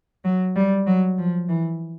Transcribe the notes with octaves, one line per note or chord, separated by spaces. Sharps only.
F#3
G3
F#3
F3
E3